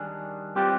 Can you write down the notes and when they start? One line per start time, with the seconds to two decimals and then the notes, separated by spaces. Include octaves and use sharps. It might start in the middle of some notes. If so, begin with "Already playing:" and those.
Already playing: D#3 G3 D4 G#4
0.55 G3 C4 F4 G4 B4 D5